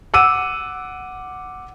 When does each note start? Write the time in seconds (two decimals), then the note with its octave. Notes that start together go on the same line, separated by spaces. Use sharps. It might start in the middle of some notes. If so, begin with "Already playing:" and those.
0.14 F#5 D6 E6 D#7